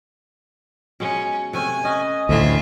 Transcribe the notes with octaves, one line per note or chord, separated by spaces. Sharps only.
B2 G#3 C#4
C3 A3 C#4 G#5
C#4 B4 D#5
D2 A2 E3 A3 E4 F4 E5